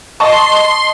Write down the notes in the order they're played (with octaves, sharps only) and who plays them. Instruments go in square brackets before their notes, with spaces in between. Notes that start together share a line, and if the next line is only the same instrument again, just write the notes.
[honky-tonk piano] D#5 A5 C#6 [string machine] C6